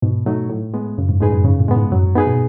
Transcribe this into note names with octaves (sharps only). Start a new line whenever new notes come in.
G#2 B2
F#3 A3 D#4
A2
G#3 B3
F#2 C#3
G#2
A2 G#3 D#4 G#4 B4
F#2
G#2 C#3
A2
G#3 B3
G#2
F#2 F#3
G#2
G#2 B3 D#4 G#4 B4
B2